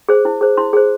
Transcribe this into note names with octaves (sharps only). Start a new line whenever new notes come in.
G#4 C5
E4
G#4 C5
E4 C6
G#4 C5